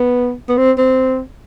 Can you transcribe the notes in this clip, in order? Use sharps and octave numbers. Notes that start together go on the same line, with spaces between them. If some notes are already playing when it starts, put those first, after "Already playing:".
Already playing: B3
B3
C4
C4